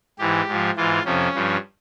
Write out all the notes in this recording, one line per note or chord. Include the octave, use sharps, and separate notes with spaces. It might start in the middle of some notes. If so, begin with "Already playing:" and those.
G#2 E3 G4
G#2 F3
G#2 E3 F4
F2 C3 F3 C#4
G2 F3